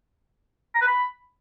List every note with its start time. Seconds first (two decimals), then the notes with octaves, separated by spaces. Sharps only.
0.75 A#5
0.81 B4
0.87 B5